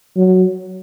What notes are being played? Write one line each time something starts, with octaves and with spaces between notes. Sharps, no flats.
F#3